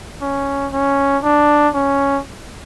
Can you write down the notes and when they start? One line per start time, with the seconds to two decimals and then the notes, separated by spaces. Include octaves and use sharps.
0.22 C#4
0.73 C#4
1.23 D4
1.74 C#4